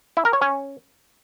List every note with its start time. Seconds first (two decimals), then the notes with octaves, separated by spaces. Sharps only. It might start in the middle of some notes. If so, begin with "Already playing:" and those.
0.17 E4
0.25 A#4
0.33 C#5
0.42 C#4